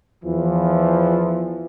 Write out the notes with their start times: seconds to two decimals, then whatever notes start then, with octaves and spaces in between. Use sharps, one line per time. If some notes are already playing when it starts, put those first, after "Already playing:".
0.25 E2 E3 F3